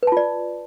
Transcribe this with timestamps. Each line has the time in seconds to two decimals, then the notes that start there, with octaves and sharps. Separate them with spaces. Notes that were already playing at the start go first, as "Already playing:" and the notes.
0.03 B4
0.07 A5
0.12 F4
0.17 D5